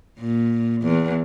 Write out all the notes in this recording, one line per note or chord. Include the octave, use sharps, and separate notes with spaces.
A#2
E2